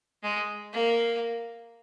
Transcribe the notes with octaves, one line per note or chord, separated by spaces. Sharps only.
G#3
A#3